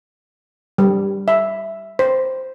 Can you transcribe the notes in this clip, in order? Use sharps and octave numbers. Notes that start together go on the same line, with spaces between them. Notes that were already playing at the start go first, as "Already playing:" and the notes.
G3
E5
C5